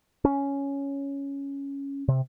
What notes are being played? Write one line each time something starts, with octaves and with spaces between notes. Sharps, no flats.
C#4
C3